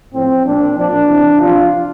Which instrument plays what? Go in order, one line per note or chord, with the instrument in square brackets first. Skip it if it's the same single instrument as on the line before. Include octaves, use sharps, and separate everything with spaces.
[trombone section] A2 F3 C4
A#2 F3 D4
A#2 F3 D4
C3 E3
C3 F3 F4